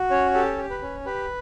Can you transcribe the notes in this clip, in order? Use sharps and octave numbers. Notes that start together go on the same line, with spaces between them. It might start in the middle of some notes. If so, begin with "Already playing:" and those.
Already playing: F#4
C#4 C#5
G4 A4
G4
B4
C#4
G4 B4